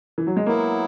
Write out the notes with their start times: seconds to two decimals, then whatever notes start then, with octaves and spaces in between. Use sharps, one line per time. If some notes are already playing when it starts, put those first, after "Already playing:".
0.18 E3
0.27 F#3
0.37 G#3
0.46 F#3 A#3 B3 E4